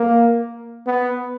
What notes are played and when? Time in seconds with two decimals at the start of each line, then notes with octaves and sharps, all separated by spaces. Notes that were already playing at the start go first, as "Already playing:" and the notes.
Already playing: A#3
0.87 B3